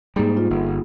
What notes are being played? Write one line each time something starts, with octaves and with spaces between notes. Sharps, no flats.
G#2 G3 A#3 D#4 G#4
F4
G1